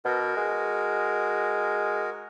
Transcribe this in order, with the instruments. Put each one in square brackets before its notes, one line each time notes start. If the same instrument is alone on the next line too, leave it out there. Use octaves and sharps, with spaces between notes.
[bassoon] B2 [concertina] F#4 A#4
[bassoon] G#3